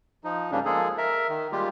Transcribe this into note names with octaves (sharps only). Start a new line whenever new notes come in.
F3 D#4
G#2 C#3 G3 A#3 C#4 D4
F3 G#3 A#3 G#4 A4
A#4 E5
D#3
G3 G#3 A#3 F4 G4